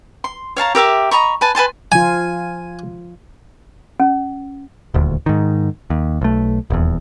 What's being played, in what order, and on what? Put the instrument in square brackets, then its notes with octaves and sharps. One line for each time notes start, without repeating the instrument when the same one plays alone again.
[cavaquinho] C6
C#5 F5 A5 A#5
G4 A#4 E5 D6
D#5 A#5 B5 C#6
B4 G#5 A5
B4 G#5 A5 C6
[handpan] F3 F4 [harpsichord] G#5
[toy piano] C#4
[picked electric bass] D#1 D2
G#2 D#3
D#2
B1 A3
D#1 E2